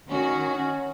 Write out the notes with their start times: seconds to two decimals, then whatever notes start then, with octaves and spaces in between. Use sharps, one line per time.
0.11 D#3 C#4 F#4
0.55 C#4